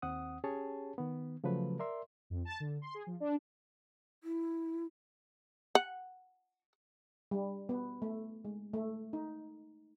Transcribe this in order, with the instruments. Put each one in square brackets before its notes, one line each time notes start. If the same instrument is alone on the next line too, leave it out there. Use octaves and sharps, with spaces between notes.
[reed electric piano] D#2 C4 F#5 D#6
C#4 G4 G#4 C#5 A5
D#3 B3
C#3 F3 F#3 A3 B4
A#4 D5 E5 C6
[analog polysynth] F2
A5
D3
C6
G#4
F3
D4
[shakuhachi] E4
[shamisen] F#5
[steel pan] G3
B3
A3
G#3
A3
D#4